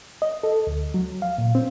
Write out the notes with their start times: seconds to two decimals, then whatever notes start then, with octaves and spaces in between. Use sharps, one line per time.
0.22 D#5
0.43 A4
0.67 D2
0.94 F#3
1.22 F5
1.38 A#2
1.55 C4